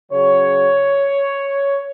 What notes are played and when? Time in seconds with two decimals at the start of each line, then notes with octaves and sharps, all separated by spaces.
0.12 C#3 F#3 C#5